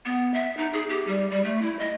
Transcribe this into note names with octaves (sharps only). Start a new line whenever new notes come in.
B3
E5
D#4
G#4
G4
G3
G3
A3
E4
D#5